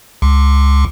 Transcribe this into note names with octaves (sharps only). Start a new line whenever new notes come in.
C#2